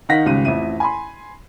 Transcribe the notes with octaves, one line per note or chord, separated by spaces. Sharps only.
D#3 D#4 F5 F#5 A#6 B6
G#1 C#2 C#3 G3 D#7
A1 F2 E5 D#7
G#5 B5 C6